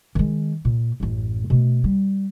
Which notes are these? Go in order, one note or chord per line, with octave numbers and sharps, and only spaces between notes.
D#3 G#3
A#2
A1 F#2
B2 A3
G3